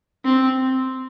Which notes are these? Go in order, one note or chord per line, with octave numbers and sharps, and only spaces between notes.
C4